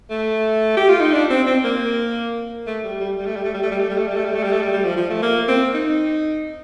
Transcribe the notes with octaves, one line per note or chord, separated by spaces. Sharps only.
A3
G4
F4
D#4
D4
C4
C4
A#3
A3
G3
G3
G3
A3
G3
A3
G3
A3
G3
A3
G3
A3
G3
A3
G3
A3
G3
A3
G3
G3
F3
F3
A3
A#3
C4
D#4